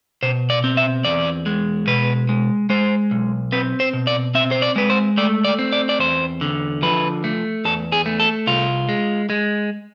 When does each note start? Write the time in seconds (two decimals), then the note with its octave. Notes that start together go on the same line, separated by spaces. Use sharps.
0.23 B2 C5
0.50 D5
0.64 C4
0.77 E5
1.05 E2 D5
1.46 G#3
1.87 B2 B4
2.29 G#3
2.70 G#3 C5
3.11 B1
3.52 C4 B4
3.80 C5
3.93 B2
4.07 D5
4.35 C4 E5
4.51 C5
4.62 D5
4.76 G#3 B4
4.90 C5
5.17 A3 D5
5.45 D5
5.59 C4
5.72 D5
5.89 D5
6.00 E2 C5
6.41 D3
6.82 F3 B4
7.24 A3
7.65 E2 A4
7.92 G#4
8.06 A3
8.20 A4
8.47 C2 F4
8.89 G#3
9.30 G#3